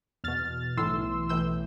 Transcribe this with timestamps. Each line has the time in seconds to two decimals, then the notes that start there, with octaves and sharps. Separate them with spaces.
0.24 E2 B2 F6 A6
0.77 B1 A2 E3 C6 E6
1.29 B1 A2 E3 E6 G6